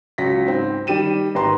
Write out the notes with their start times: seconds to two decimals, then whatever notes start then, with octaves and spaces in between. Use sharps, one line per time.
0.18 C#2 F#3 A#6 B6
0.46 G#2 C4
0.87 D#3 G3 G4 D#7 E7
1.35 G#1 G4 B4 A#5 C6